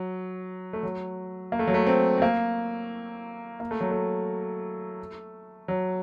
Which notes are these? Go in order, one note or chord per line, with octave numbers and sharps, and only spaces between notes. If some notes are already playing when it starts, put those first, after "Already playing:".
Already playing: F#3
A3
F#3
A#3
A3
F#3
A3
C4
C4
A#3
A#3
A3
F#3
A3
F#3